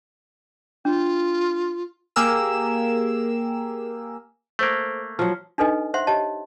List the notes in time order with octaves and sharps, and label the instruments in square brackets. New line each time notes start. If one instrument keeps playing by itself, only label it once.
[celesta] D4 [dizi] F4
[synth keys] A#3 G4 G#4 A#4 E6 E7
[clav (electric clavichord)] A3 A#3 [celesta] A4 C5 D7
[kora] F3 F#3 [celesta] F6
[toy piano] D4 D#4 A4 B4 D#5 G#5
C5 E5 F#5 C6
G4 C#5 D#5 A5